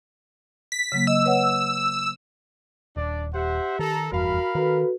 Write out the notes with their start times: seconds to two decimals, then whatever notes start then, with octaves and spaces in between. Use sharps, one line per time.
0.72 B6
0.92 C#3 F#3 A#3
1.07 D#5 E6
1.25 B4 C#5 F#5
2.96 D#1 D4 D5
3.34 G4 C5 E5 F#5
3.79 D#3 A4 A#5
4.12 F1 E2 G2 F#4 A#4 F5 B5
4.55 D#3 F#4 A4 B4